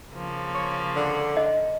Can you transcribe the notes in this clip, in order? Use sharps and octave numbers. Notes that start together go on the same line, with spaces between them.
C#3 F3 A#3
C#5
D3
D#5